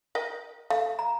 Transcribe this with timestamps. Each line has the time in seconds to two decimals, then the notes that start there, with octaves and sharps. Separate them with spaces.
0.15 A#4 D#5 G5
0.70 A3 F5
0.99 A#5